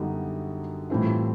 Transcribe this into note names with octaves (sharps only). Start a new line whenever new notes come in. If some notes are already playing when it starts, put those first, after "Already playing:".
Already playing: F#2 D3 G3 B3 D#4
A2 E3 G3 C4 F4